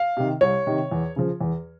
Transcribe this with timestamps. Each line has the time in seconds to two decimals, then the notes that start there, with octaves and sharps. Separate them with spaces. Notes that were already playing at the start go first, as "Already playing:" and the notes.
Already playing: F5
0.17 C3 D#3
0.41 C2 C#5
0.67 C3 D#3
0.91 E2
1.16 C#3 F3
1.41 E2